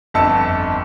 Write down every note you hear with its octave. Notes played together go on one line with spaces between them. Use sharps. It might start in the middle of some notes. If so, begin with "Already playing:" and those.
G1 F2 A5 E6 C#7